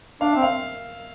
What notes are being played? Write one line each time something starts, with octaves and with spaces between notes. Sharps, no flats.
D4 F5
C4 E5
F5